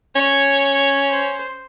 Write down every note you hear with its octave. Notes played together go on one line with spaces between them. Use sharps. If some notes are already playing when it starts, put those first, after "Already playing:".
C#4 C#5
C5